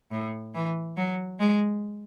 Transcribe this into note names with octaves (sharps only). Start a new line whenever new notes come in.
A2
E3
F#3
G#3